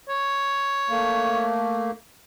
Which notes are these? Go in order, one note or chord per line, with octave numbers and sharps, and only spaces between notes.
C#5
A3 A#3